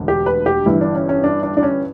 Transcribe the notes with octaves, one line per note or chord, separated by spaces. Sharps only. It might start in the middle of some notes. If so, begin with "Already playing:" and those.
Already playing: E1 D2 D3
G4
B4
G4
G1 G2 E3 E4
D4
C#4
C#4
D4
D4
D4
C#4